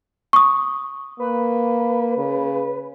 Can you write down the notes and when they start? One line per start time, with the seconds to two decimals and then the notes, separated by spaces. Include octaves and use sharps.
0.33 C#6 D#6
1.20 A#3 B4
2.17 C#3